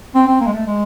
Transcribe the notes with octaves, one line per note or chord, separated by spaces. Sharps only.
C4
C4
A#3
G#3
A3
G#3